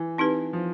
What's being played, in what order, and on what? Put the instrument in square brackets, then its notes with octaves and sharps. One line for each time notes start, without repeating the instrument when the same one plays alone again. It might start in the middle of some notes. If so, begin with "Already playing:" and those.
Already playing: [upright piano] E3
[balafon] C4 D#4 G4 B4
[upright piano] F3